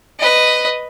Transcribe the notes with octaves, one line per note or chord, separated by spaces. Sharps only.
B4 D#5